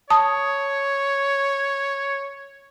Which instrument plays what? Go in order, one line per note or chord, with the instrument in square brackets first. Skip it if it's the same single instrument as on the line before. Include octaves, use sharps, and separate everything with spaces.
[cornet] C#5 [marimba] A5 D#6